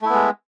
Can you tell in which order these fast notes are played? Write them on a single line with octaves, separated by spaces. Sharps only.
A3 E4 B3 G#3